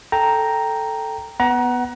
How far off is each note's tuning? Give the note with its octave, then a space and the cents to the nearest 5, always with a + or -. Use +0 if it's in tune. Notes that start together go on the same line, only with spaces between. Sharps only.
A4 +0 G5 +0 A#5 +0
B3 +0 F#5 +15 A#5 +30